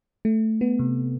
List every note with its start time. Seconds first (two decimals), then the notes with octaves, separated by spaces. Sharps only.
0.25 A3
0.61 B3
0.79 C3